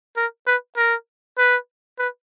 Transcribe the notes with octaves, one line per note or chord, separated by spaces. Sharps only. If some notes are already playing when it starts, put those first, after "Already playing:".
A#4
B4
A#4
B4
B4